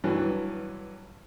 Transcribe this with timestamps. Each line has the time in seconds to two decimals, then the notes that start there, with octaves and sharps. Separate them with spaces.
0.04 G2 E3 F#3